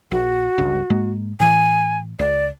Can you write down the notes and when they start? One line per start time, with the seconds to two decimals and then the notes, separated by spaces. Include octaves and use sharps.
0.11 A#1 F#4
0.58 G1 C#2 G2
0.90 G#2 G#3 A#3
1.40 A2 E3 G#5
2.19 C#2 D5